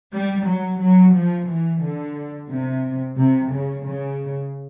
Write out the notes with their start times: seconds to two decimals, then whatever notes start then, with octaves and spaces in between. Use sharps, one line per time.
0.13 G3
0.47 F#3
0.81 F#3
1.15 F3
1.48 E3
1.83 D3
2.49 C3
3.17 C3
3.51 C#3
3.84 C#3